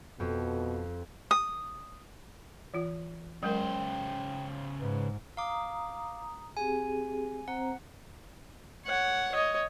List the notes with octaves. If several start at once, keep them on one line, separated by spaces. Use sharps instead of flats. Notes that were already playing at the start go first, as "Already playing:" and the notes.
F2 B2
D#6
E3 F4
C#3 F#3 G#3 A#4 C5 G5
G#2 B4
F5 A#5 D6 D#6
C4 G4 G#4 G#5
C4 C5 F#5 A#5
C#5 F#5
C#5 D#5